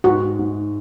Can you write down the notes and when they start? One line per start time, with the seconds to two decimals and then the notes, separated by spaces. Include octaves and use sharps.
0.04 G#2 F#4
0.39 G#2